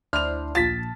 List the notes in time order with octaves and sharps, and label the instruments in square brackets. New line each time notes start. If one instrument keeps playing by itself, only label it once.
[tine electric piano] D2 [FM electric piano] D4 E4 C5 [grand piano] F6 F7
[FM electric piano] A#1 A5 [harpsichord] F4 [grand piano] A6 B6